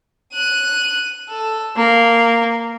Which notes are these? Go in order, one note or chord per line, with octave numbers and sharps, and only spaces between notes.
F#6 D#7
A4
A#3